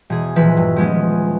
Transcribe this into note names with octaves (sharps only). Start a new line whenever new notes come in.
E1 G#4
D#1 E3 F3 B4 E6 B6
G2
F3 G#3 B3 C#4